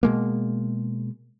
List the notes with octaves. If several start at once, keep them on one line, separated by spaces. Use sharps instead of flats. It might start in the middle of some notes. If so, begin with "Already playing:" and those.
B2 G#3 A#3